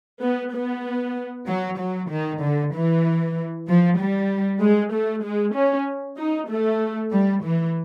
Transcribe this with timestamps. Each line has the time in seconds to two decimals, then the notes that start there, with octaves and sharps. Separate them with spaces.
0.21 B3
0.53 B3
1.46 F#3
1.78 F#3
2.10 D#3
2.40 D3
2.72 E3
3.66 F3
3.97 G3
4.60 G#3
4.92 A3
5.23 G#3
5.55 C#4
6.17 D#4
6.48 A3
7.12 G3
7.43 E3